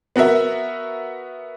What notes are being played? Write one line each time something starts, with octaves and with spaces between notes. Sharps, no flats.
B3 F#4 A#4 E5